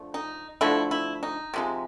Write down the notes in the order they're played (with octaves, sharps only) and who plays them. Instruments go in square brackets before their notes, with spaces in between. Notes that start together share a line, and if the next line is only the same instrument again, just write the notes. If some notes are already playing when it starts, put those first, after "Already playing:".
Already playing: [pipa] D3 F3 A3
D#4
D3 F3 A3 E4
E4
D#4
C3 F3 G#3